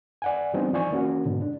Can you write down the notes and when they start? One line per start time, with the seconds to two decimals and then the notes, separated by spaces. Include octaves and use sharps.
0.22 D5 F#5 G#5
0.54 E3 G3 B3 C4 D4 D#4
0.73 F3 D5 G#5 C#6
0.91 E3 A#3 C#4 F#4
1.25 G#2 B2 D3
1.42 D4